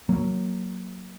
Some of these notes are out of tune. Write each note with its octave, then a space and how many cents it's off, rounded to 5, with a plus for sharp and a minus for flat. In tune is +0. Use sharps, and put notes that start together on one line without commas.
F#3 +0 A#3 +0